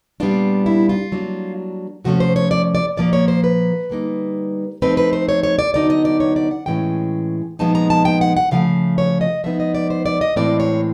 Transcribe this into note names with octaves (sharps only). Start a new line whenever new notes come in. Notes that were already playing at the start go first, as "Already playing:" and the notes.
A#2 G3 B3 D4 F4
E4
F4
F#3 A#3 D4
C3 F3 A3 C#4 F#4
C5
C#5
D5
D5
A#2 F3 A#3 D5
C#5
C5
B4
D3 G3 A#3 D#4
F3 A3 C4 D#4 B4
B4
C5
C#5
C#5
D5
D3 F#3 B3 D#4 D5
D#5
D5
C#5
D5
F#5
A2 E3 G#3 C#4 G5
A#2 F3 G#3 B3 D#4 A5
A#5
A5
G5
F#5
F#5
C#3 F3 A3 F5
C#5
D#5
F3 G#3 B3 D#4 E5
D#5
D5
C5
D5
D#5
A2 E3 G#3 C4 D5
C#5